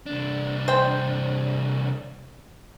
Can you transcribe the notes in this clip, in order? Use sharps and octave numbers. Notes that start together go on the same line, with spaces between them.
C2 D4
C5 G5